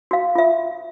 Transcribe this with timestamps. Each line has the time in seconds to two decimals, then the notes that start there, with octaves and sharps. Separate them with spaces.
0.11 F#4 F5
0.35 F4 E5